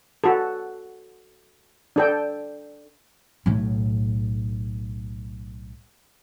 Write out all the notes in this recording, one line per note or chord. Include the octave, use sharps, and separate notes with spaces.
F#4 A4
D4 A4 G5
B1 A2